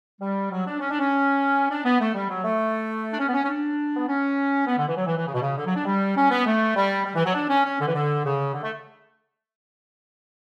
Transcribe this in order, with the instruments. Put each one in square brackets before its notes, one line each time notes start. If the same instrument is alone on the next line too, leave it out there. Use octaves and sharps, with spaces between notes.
[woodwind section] G3
F#3
D4
C#4
D4
C#4
D4
B3
A3
G3
F#3
A3
D4
C#4
B3
C#4
C#4
D4
B3
C#4
B3
D3
E3
F#3
E3
E3
C#3
B2
C#3
D3
F#3
D4
G3
C#4
B3
A3
G3
G3
E3
F#3
D4
C#4
C#4
D3
E3
D3
C#3
D3
A3